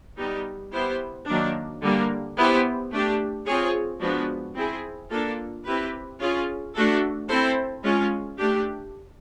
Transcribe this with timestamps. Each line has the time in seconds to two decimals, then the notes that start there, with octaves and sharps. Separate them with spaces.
0.18 G3 B3 D#4 G4
0.73 B3 E4 G4 C5
1.27 D#3 F#3 A#3 D4
1.82 D3 G3 A#3
2.37 B3 E4 G4 C5
2.91 A3 D4 G4
3.46 C4 F4 G#4 C#5
4.00 F3 G#3 B3 D4 F#4
4.55 C4 E4 G#4
5.10 A#3 D4 F4 A4
5.65 C4 E4 G4 B4
6.20 C#4 F4 G#4
6.74 A3 D4 F#4 A4
7.28 C4 E4 A4 C5
7.83 G#3 C#4 F4
8.38 A3 D4 G4